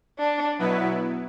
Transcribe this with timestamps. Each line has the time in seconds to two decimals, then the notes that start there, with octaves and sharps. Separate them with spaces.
0.19 D4
0.59 B2 F#3 B3 E4 B4